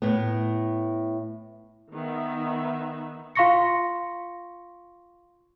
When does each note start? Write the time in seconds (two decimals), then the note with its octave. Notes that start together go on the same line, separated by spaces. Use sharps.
0.02 A2 B3
1.92 D#3 B3 E5
3.35 F4 F5 C6 C#6 A#6 C#7